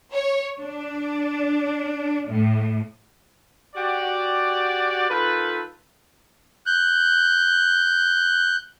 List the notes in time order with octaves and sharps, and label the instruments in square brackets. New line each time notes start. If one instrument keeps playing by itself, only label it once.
[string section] C#5
D4
A2
[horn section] F#4 G4 D5
D#3 F4 A4 B4
[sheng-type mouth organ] F#6 G6